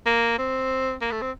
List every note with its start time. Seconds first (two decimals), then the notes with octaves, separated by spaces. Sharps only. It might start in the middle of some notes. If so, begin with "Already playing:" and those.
0.06 A#3
0.38 C4
1.01 A#3
1.11 A3
1.22 C4